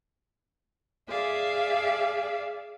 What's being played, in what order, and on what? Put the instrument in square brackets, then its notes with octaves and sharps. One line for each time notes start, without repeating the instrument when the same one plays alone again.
[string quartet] G#4 D5 E5 F5